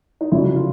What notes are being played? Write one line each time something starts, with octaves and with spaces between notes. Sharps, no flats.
D#4
F1 F2 C#3 F#3 E4
F4